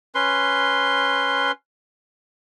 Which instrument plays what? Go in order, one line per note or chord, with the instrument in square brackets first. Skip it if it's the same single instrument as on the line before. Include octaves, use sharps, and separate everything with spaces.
[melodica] C#4 B4 C6